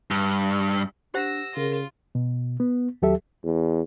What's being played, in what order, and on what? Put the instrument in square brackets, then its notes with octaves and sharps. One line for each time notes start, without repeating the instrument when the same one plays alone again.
[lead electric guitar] G2
[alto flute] D4 [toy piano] G4 C5 F#5 [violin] E6 A#6
[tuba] C#3 [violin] F4 [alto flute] A#4
[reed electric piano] B2
B3
D#2 F#3 G4 A4 E5
[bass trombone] E2